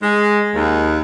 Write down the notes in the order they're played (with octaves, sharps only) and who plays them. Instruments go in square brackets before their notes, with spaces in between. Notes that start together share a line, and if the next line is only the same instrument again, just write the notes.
[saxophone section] G#3
D#2